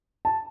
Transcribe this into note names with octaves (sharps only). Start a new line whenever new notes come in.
A5